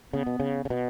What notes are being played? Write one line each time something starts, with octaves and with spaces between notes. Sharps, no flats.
C#3 B3
B2
C#3
C#3
B2 B3